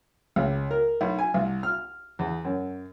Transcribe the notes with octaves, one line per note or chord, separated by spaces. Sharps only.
C#2
A#4
B1
G#5
C2
F6
E2
F#2